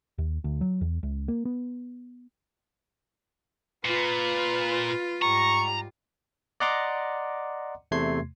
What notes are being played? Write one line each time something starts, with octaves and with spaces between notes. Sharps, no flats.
D#2
D2
F#3
E2
C#2
A#3
B3
A#2 F4 B4 F5
G#2 G3 A#5 C#6
D5 D#5 F#5 A#5 C6 D6
E2 C3 A3 C6 G#6 C7